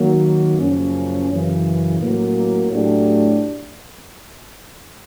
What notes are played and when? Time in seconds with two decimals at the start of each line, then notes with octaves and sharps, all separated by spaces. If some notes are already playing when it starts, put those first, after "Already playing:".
Already playing: D#3 F#3 A#3
0.59 F#2 C#3 F3 A#3 C#4
1.30 F#2 C#3 E3
1.99 A2 F#3 A#3 C#4
2.70 A2 F#3 A3 D4 G4